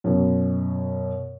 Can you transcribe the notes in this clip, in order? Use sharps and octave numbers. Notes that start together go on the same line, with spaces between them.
F#2 B2